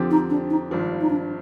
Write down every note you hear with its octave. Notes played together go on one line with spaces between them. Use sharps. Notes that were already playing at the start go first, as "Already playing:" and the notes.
Already playing: F2 D3 F3 C4 G4
D#4
D4
D#4
G#1 G2 F3
D#4
D4